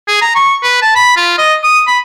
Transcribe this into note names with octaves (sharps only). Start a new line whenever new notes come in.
G#4
A#5
C#6
B4
A5
B5
F4
D#5
D#6
B5